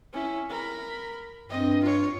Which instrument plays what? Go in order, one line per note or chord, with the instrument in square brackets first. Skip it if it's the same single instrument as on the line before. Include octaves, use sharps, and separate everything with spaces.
[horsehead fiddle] C#4 E4
A#4 B5
[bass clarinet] G2 [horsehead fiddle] C4 D#5
[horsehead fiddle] F4 C#5